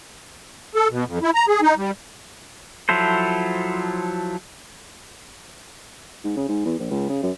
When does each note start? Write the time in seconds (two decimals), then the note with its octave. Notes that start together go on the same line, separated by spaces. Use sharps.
0.75 A4
0.90 B2
1.06 F2
1.22 E4
1.34 A#5
1.48 G#4
1.62 D#4
1.77 G3
2.89 F3 F#3 E4 A4 C5
6.24 G#2
6.36 C#3
6.49 G#2
6.65 E2
6.79 A#1
6.90 C#2
7.09 C#3
7.22 F#2